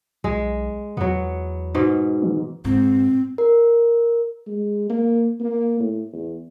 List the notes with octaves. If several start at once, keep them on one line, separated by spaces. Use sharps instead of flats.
B1 G#3
E2 F#3 B3
G#2 B2
E3
G#2 B2 C4
A#4
G#3
A#3
A#3
A2
E2